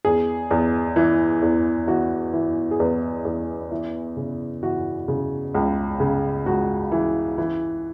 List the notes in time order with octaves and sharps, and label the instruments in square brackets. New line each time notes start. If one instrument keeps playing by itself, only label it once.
[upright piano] E2 G#4
E2
E3
E2
E3 F#4
E3
G#4
E2 B4
E2
E3
C#3
E3 F#4
C#3
C#2
C#3
C#2 F#4
E3
E3